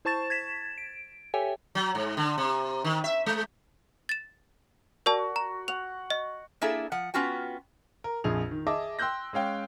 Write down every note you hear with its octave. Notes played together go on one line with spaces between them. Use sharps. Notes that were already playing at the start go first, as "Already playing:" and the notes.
E4 C5 A5 C#6 A6 E7
G#6 A6 B6 E7
D7
G4 A4 C#5 E5 G5 G#5
F#3
G#2
D3
C3
D#3
E5
G#3
A6 E7
F#4 A#4 D5 A5
A#5
F#5 F7
D#5
A#3 D4 E4 G#4 A4 E5
F3 F#5
B3 C#4 F4 F#4 G5
A#4
A#1 F2 G#4 F7
D#3
G#4 D#5 E5 A5 D6
G5 C6 E6 F#6 G6 A#6
G#3 C#4 F5 G5